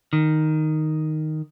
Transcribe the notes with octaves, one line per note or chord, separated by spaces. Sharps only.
D#3